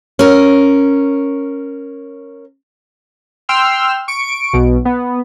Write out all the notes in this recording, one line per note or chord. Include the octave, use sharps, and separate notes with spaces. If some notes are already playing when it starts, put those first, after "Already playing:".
C#4 A#4
G5 C6 E6 F6
C#6 D7
B1 B2
B3